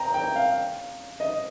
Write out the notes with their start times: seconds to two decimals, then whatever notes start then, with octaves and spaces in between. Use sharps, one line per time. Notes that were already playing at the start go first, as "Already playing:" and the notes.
Already playing: G5 A#5
0.14 G5
0.36 F5
1.20 D#5